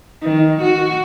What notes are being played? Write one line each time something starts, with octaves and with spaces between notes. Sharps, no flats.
D#3
F#4